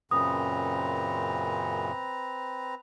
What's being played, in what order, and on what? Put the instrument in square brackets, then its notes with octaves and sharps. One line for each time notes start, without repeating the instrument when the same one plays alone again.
[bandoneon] F#2 A#2 C#3 [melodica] C4 B4 A#5 [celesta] D#6